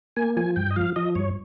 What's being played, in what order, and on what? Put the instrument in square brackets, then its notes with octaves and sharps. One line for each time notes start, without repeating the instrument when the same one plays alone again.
[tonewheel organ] A#3 G#5
F3 G#5
G2 G5
D#5
F3 F5
F3 D#5
G2 C#5